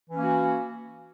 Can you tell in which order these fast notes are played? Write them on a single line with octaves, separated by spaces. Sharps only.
E3 C#4 A#3 F#4